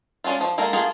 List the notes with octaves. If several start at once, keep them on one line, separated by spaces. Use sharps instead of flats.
G#3 C#4 D4 F4
F3
G#3 A#3 A4 A#4
A3 A#3 F4 G#4